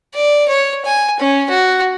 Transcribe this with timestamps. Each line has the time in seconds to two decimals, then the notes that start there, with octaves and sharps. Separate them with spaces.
0.15 D5
0.48 C#5
0.85 G#5
1.20 C#4
1.50 F#4